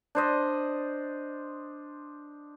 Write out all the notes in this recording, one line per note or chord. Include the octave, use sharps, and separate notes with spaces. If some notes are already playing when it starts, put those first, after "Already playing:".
D4 C5 D#5